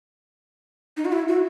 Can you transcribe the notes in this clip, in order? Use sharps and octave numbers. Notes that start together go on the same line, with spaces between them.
D#4
F#4
E4
F#4